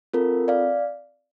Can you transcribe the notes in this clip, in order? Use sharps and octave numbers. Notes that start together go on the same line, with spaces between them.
C4 F4 A4 A#4
D5 F5